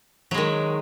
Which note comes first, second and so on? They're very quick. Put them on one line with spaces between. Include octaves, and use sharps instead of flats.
F#3 G#3 D#3